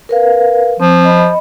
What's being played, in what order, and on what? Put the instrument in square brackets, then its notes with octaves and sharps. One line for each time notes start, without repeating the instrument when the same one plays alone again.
[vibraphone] A#4 B4 F5
[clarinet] F3 [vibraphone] C4
[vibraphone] D#5 B5